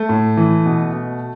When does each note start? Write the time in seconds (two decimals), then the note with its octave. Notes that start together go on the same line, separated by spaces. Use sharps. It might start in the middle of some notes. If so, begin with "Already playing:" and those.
Already playing: A3
0.09 A2
0.37 E3
0.66 B2
0.93 B2